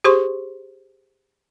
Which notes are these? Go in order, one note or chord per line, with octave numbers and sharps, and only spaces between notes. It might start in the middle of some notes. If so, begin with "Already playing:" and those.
G4 G#4 C5 C6 C#6